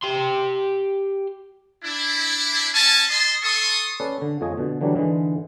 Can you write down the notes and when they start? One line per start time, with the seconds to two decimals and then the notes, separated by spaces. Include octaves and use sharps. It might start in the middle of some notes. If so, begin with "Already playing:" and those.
0.03 G4 C6
1.83 D4 E4
2.73 C#4 C#5 G#5 A5
3.09 D#5 A5 C6
3.42 A4 A5 C6 C#6 D#6
4.00 C#4 A4 B4 D5
4.22 D3
4.41 F2 F3 G#3 C#5 D#5 G#5
4.57 B2 D3
4.81 D3 E3 F#3 G3 D4
4.94 G#2 D3 E3 G#3